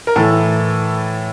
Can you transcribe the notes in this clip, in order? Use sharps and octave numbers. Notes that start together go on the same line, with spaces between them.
A#4
A2 E3 A4